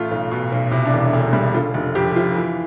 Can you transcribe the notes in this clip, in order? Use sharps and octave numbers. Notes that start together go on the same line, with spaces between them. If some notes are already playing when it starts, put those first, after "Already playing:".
Already playing: A1 A3 F4
B1
B2
B1
C3 E4
D4
E1
E4
D2
G3
D3 F4
F1
F2 G4
F3 F4
E3